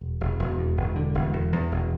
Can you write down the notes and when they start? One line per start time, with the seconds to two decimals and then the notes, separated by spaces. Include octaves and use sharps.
0.01 E1
0.20 E1
0.39 E1
0.58 E2
0.77 E1
0.96 D3
1.14 E1
1.33 E2
1.52 E2
1.71 E1